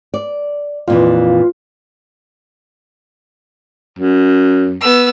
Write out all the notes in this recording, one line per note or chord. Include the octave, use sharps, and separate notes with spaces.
D5
F2 A#2 E3 F4
F#2
B3 E6